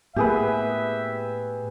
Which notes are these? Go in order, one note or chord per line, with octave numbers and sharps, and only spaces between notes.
A2 A#3 B3 G4 G#4 B4 E5